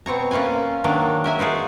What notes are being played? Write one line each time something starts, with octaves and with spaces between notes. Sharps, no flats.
B2 C4 C#5 A#5
A#3 C#4 F4 F#5 G#5
D#3 F#3 A#3 D4
A#4 E5 G#5
D#4 F4 F#4 G#4